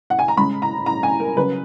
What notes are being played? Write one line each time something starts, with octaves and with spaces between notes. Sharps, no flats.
F#5
G#5
A#5
C#3 G#3 B5
A#5
A#5
G#5
A#4
C#3 F#3 B4